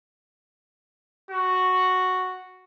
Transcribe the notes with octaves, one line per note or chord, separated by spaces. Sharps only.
F#4